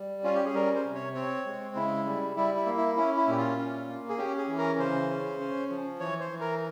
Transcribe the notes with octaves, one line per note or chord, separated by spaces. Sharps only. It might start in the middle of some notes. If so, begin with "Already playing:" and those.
Already playing: G3
C#4 F4
G4
G#4
G3 A#4
C5
C3
C#5
C4 C#5
G#3
C#3 E4
G3
G3 E4
E4
A#3
E4
C#4 E4
E4
A#2 G4
F4
C#4
A#3
G#4
C#4 G4
G#4
E3
A#4
C#3 C5
C#4
C#4
F3
E3 C#5
C5
E3
A#4